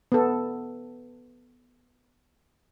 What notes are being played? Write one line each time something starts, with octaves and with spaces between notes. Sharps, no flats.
B3 A4